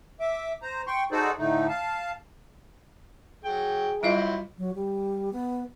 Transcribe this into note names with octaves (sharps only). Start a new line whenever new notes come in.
E5 D6
C5 A#5
G5 C6 C#6
D#4 F#4 G#4 A4 C5 D5
A2 D3 A3 D#4
F5 A5
F#3 G#4 G5
F#3 G3 E4 F4 C5 D#5
F#3
G3
B3